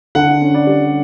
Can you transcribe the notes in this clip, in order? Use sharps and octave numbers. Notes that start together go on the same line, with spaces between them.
D3 F#5
C#4
D5
G3